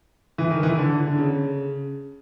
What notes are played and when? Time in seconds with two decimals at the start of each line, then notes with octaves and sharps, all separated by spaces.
0.38 E3
0.51 D#3
0.63 E3
0.78 D3
1.07 D3
1.18 C#3